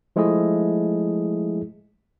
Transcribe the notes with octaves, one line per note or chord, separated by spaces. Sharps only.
F3 G#3 A3 E4 G#4 D#5